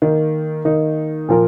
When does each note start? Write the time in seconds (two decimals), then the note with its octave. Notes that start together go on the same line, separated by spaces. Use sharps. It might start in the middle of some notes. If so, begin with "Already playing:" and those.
0.02 D#3 A#3 D#4
0.65 D#3 A#3 D#4
1.29 A#2 F3 A#3 F4 A#4